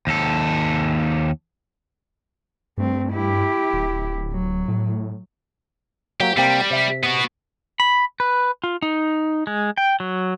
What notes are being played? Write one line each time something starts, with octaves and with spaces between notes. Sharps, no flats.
D#2 A4
G2 A3 C4
E4 G4
D1
F#3
A2
F#3 A#3 G4
C3 G3 A#3 C4
C3 E5
B3 F#4
B5
B4
F4
D#4
G#3
G5
F#3